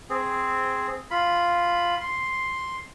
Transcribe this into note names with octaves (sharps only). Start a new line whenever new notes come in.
C4 G#4
F4 B5
C6